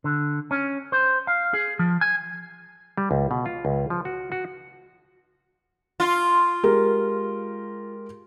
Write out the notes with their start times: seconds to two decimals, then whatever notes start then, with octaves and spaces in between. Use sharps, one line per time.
0.04 D3
0.51 C#4
0.92 C5
1.27 F5
1.54 G#4
1.79 F3
2.01 G#5
2.97 G3
3.11 C#2
3.31 B2
3.46 F4
3.65 C#2
3.90 F3
4.05 F#4
4.32 F#4
6.00 F4
6.63 G#3 G4 A#4